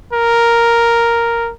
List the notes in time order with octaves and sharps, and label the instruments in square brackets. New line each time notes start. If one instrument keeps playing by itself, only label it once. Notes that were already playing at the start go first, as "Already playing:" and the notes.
[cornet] A#4